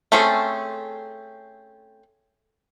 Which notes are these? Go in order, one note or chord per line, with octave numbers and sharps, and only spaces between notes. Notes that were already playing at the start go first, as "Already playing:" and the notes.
A3 C4 C#4 G#4 A4